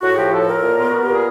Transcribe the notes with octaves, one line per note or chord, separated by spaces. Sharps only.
A2 F#4
G#4
F3 G4
A2 A4
B4
A2 A#4
A#2
B3 F4
B3 F#4
G4
A#2 G#4